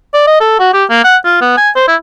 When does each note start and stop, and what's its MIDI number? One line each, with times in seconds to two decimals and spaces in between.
0.14 0.26 74
0.27 0.40 75
0.40 0.57 69
0.59 0.70 66
0.73 0.84 67
0.90 1.01 58
1.04 1.16 78
1.24 1.40 65
1.41 1.57 59
1.57 1.70 80
1.76 1.85 72
1.88 1.96 64